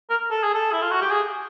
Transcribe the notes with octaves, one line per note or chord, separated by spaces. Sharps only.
A#4
A4
G#4
A4
E4
F4
F#4
G4
G#4